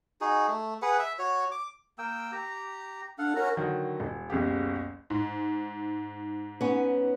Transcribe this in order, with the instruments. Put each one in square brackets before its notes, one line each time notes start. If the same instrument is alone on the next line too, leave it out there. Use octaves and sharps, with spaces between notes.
[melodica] D#4 F#4 G#4
A3
G#4 B4 F#5
E5
F#4 C#5
D6
A#3 G5 E6
G4 A#5
[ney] D4 [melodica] A4 F5 F#5
[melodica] C#4 F#4 A#5 [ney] A#4
[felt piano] D3 D#3 F#3 F#4
D#1
F#1 C#2 B2 G4
[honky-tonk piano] G#2
[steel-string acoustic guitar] B3 C#4